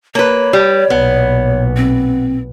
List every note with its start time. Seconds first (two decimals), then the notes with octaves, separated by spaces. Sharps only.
0.15 A#3 B4 C#5
0.53 G3
0.90 B1 A#2 B3
1.77 C4